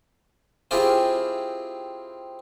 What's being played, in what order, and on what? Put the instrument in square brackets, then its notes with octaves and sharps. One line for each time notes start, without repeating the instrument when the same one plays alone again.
[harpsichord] C4 E4 F4 G4 G#4